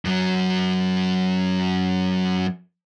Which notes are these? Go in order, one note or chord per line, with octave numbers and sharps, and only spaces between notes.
F#2 F#3